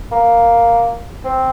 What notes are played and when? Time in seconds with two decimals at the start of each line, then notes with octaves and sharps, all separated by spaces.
0.12 A#3
1.24 C4